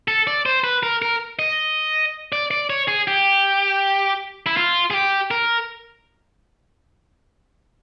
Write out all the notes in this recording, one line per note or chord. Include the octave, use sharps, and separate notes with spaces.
A4
D5
C5
B4
A#4
A#4
D#5
D5
D5
C#5
G#4
G4
E4
F4
G#4
G4
A#4